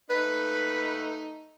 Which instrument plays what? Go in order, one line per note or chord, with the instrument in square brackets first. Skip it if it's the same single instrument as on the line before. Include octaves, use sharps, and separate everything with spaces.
[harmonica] A3 D#4 [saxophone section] B4